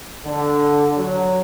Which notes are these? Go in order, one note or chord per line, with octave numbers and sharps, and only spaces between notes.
D3
F#3